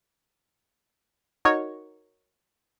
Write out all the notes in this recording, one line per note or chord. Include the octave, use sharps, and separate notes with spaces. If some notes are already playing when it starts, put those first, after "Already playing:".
D#4 F#4 A#4 C#5